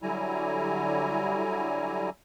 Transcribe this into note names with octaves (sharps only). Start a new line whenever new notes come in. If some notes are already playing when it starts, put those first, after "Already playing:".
D3 F#3 G3 E4 G#5 A#5